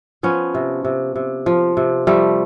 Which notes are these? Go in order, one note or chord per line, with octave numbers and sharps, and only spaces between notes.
F3 B3 C#4
C3
C3
C3
F3
C3
F3 G3 A3